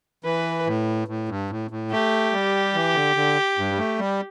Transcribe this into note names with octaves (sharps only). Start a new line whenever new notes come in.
E3 B4
A2
A2
G2
A2
A2
A3 G4
G3
E3
D3
D3
G2
G3
A3
G3